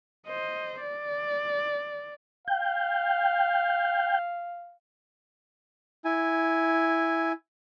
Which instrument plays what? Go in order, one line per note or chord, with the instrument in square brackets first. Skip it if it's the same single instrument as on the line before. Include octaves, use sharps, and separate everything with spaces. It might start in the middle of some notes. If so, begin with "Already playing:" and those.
[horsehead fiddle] C5 D#5
D5
[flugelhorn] F5 [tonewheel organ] G5
[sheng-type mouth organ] E4 G#5